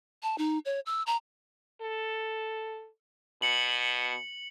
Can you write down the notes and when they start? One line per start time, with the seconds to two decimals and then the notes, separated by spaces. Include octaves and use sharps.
0.23 A5
0.38 D#4
0.65 C#5
0.86 E6
1.07 A#5
1.81 A4
3.42 B2 C#7 F#7